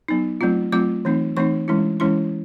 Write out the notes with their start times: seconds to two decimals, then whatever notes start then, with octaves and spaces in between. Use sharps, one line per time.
0.08 F#3 B3 D#4
0.41 F#3 A3 C4 F4
0.72 F#3 A3 C4 F4 D6
1.05 E3 A3 C4 D#4
1.37 E3 A3 C4 D#4 C#6
1.68 E3 G#3 C#4 E4
2.00 E3 G#3 C#4 E4 C6